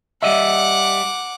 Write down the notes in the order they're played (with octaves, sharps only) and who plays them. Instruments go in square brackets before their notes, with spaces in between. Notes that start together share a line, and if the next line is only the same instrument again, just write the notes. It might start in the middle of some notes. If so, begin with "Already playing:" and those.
[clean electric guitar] G3 D#5 E5 [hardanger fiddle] F#5 D6